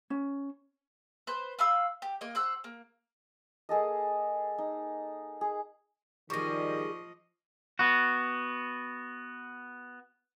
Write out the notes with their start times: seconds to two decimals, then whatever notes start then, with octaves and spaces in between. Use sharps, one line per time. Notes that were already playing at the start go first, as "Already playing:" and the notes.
0.10 C#4
1.27 B4 C5
1.59 F4 F5 B5 E6
2.02 G4
2.21 A#3 D#5
2.35 C5 F#5 E6
2.64 A#3
3.69 A#3 G#4 A4 D#5
4.58 D#4
5.41 G#4
6.30 D#3 F3 G3 G#4 D#5 C#6 D6 A#6
7.79 B3 F#4